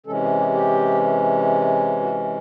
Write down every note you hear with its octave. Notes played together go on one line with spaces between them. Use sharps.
C3 E3 G#3 C#4 A4
G#4
G4
G4
F#4